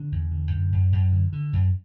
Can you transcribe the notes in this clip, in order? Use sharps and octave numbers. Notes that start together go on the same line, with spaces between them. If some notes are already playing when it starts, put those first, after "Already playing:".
Already playing: D3 D4
E2
D3
F#2
F#2
F#2
D3
D3
F#2